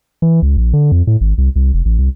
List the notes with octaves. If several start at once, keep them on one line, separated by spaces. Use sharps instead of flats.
E3
C#2
A#1
D3
F2
A2
G#1
C2
C2
F1
A1
C2